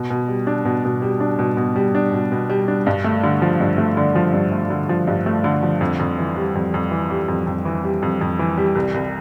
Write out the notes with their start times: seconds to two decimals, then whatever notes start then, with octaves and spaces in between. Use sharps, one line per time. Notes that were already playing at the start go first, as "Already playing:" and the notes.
Already playing: B2
0.10 B2
0.28 G3
0.47 D4
0.65 B2
0.85 B2
1.02 G3
1.20 D4
1.39 B2
1.57 B2
1.76 G3
1.95 D4
2.13 B2
2.32 B2
2.50 G3
2.68 D4
2.87 G2
3.04 A3
3.23 D3
3.42 F3
3.60 G2
3.78 A3
3.97 D3
4.15 F3
4.33 G2
4.52 A3
4.70 D3
4.89 F3
5.07 G2
5.26 A3
5.44 D3
5.63 F3
5.81 F2
5.99 F2
6.18 E3
6.36 G3
6.55 F2
6.74 F2
6.91 E3
7.10 G3
7.28 F2
7.47 F2
7.65 E3
7.84 G3
8.02 F2
8.21 F2
8.39 E3
8.58 G3
8.75 C2
8.94 C2